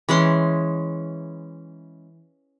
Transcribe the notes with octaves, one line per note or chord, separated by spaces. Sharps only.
E3 G#3 C#4 C6